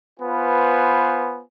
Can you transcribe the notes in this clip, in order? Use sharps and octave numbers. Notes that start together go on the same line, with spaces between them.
B3 F4 B4 C5 G#5